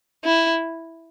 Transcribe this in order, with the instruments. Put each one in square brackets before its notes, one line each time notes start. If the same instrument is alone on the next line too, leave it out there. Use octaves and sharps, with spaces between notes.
[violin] E4